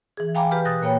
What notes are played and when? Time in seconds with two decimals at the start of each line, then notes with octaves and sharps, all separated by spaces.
0.17 E3 G#4
0.35 F5 G5 G#5 A#5 B5 D6
0.51 G4 B4 B5 F6
0.65 B2 D#6 F#6 A6 A#6
0.82 A#2 A#3 C#5 G5 B5